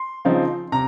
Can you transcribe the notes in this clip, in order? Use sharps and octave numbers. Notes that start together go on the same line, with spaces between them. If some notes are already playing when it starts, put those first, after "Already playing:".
Already playing: C6
C#3 F3 C4 D#4
C3 A#5